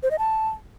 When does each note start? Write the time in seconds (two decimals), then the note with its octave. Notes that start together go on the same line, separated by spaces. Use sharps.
0.03 C5
0.11 D#5
0.19 A5